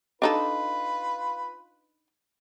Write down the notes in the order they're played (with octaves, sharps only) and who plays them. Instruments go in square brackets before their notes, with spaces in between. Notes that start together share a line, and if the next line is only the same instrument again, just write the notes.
[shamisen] D4 D#4 A4 [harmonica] F4 B4